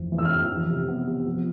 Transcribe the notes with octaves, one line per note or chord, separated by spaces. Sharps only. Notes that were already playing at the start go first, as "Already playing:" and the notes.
Already playing: F2 E3 C4
E3
E6
F6
E3
F3
C3
B3
C3
F3